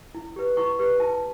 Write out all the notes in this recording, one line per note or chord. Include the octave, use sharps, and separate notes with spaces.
E4
G4 B4
E4 C#6
G4 B4
E4 A5